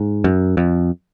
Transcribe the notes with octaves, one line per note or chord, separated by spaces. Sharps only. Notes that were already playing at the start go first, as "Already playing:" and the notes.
Already playing: G#2
F#2
F2